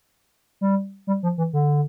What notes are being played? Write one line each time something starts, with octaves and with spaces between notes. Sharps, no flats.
G3
G3
F3
E3
D3